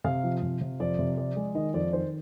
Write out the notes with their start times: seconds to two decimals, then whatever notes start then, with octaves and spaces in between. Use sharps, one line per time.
0.04 C3 F5
0.24 F3
0.43 C3
0.61 C3
0.80 F2 D5
0.99 C3
1.17 F3 D5
1.36 G#3
1.55 D#3 D#5
1.74 F2 D5
1.93 D#3 C5